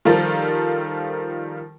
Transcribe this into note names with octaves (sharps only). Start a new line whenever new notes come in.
D#3 F3 G3 F4 A4 A#4